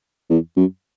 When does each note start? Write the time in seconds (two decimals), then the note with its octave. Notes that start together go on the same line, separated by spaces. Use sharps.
0.30 E2
0.56 F#2